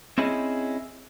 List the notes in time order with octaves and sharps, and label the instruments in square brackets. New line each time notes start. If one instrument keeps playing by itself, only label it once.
[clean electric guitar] C4 C#4 E4 G#4 D#5